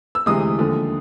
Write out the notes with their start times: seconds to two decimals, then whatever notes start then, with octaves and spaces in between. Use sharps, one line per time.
0.15 E6
0.26 D2 C3 E3 G#3 D#6
0.58 D#2 D3 F3